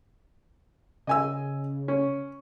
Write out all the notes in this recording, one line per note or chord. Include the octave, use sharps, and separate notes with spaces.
C#3 D#5 G#5 E6
C#4